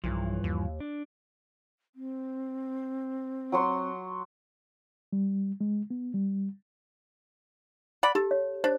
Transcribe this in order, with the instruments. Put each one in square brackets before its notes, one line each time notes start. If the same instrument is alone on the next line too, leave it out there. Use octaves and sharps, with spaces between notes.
[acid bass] B1 [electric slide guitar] G2 E3 F3
[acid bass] D#2
[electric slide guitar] D4
[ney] C4
[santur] F#3 F#4 C6
[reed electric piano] G3
G#3
B3
G3
[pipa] D5 F#5 B5
[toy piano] G4 [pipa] A4
[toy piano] C#5
[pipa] D4 [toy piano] C5